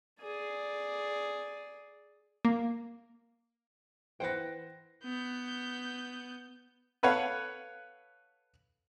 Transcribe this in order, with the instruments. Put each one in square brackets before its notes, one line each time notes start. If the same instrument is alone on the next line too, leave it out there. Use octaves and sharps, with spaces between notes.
[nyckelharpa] G#4 D5
[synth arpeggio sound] A#3
[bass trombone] E3 [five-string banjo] B4 F#5 G5 [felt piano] C5 A#6
[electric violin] B3 G6
[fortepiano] A4 B4 C#5 F5 F#5